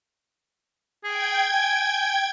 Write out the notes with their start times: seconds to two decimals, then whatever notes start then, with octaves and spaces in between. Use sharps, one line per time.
1.04 G#4 G5 G#6
1.53 G#5